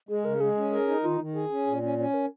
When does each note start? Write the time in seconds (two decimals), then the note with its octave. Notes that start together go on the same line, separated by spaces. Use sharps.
0.09 G#3 G#4
0.25 C#3 A#4
0.40 G#3 G#4
0.57 C#4
0.72 A#4
0.87 D#4
1.03 D#3 F4
1.20 D#3
1.35 G#4
1.51 C#4
1.67 A#2
1.82 C#4
1.98 C#4 C#5
2.14 A#4